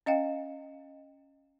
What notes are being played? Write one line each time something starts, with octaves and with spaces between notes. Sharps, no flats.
C#4 D#5 F5 G5